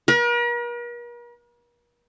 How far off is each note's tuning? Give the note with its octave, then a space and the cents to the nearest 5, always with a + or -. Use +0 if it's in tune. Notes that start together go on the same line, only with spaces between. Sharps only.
A#4 +45